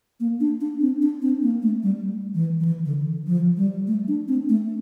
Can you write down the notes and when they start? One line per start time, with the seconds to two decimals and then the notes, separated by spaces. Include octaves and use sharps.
0.20 A#3
0.40 D4
0.61 D4
0.81 C4
1.02 D4
1.22 C4
1.42 A#3
1.62 A3
1.83 G3
2.34 E3
2.60 F3
2.65 E3
2.85 D3
3.27 F3
3.57 G3
3.87 A3
4.08 D4
4.28 C4
4.49 A3